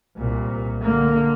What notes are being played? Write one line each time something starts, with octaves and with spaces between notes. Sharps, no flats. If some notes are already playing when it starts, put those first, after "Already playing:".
C2 A#2
D3 A#3